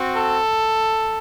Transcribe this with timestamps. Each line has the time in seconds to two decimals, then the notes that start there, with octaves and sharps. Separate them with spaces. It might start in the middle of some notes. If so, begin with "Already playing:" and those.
Already playing: C4 F#4
0.16 A4